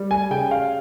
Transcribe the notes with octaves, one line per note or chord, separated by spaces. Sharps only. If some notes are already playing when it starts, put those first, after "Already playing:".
Already playing: G3
G#5
C#3 G5
F5